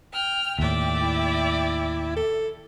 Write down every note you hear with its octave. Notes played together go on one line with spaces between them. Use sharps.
G5 F6
D#2 A2 D5 E5 G5
E4
A4